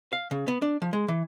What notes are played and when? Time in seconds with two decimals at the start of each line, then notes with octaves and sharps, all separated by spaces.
0.13 F5
0.31 C#3
0.48 B3
0.62 D4
0.82 F3
0.93 G#3
1.08 E3